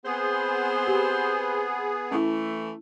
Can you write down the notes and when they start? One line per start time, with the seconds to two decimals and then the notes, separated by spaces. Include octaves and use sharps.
0.05 B3 C4 G#4 C5
0.87 G4
2.11 E3 A3 C#4 E4